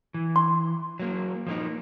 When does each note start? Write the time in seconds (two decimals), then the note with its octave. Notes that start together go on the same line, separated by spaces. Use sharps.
0.14 E3
0.36 C6
0.99 F#3 A#3
1.47 F3 A#3 D#4